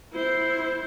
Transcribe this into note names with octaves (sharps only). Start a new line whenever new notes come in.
E4 C5